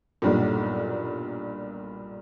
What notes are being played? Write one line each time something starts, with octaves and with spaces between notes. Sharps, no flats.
B1 G2 A#2